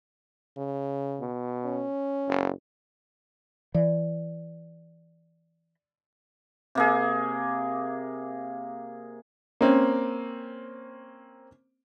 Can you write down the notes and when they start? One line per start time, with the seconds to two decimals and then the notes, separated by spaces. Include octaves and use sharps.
0.57 C#3
1.21 B2
1.65 C#4
2.28 F#1
3.75 E3 D5
6.75 C3 A#3 G#4
9.61 A#3 C4 C#4